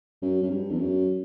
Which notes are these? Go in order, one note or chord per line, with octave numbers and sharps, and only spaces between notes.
F#2
F#2
G2
E2
F#2